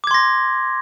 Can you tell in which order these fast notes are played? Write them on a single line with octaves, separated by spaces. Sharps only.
D6 G#6 C6 A#6